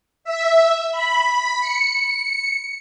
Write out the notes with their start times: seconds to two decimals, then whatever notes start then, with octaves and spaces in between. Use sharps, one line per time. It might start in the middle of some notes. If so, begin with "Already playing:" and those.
0.24 E5
0.92 B5
1.61 C#7